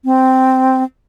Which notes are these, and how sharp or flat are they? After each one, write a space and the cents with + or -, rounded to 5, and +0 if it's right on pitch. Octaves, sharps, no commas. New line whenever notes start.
C4 -5